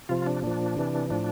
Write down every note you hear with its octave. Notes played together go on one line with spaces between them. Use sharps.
C3 F3 F4
D4
A#2 F3 D4
C3 E3
A2 F3 D4